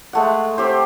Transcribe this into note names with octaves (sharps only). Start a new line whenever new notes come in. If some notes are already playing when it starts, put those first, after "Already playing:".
G#3 A3 F#5
C4 G4 C5